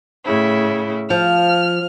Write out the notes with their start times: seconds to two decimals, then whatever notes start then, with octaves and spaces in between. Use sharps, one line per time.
0.25 A2 C#3 E4
1.10 F3 F6